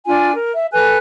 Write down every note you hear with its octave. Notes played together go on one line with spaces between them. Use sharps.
D4 F4 G#5
A#4
E5
A4 B4 G#5 F#6